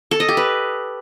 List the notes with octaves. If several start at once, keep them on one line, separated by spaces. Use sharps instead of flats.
A4
D#5
G4
B4